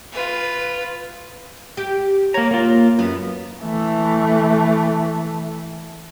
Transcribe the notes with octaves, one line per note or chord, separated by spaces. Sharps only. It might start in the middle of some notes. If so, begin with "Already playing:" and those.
F4 B4
G4
A#3 C#5 A#5
A#3 F4
F#2 B3
E3 A3